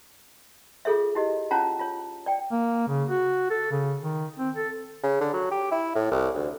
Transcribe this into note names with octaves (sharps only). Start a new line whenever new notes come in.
F4 G#4 A4 C#5 E5
E4 G4 D#5
C#4 F4 C#5 F#5 A5 A#5
F4 C#5
D5 G5
A#3
C#3
F#4
A4
C#3
D#3
C4
A4
C#3
D3
F#3
G4
E4
A2
C2
D2